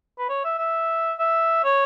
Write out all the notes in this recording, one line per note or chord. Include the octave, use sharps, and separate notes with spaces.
B4
C#5
E5
E5
E5
C#5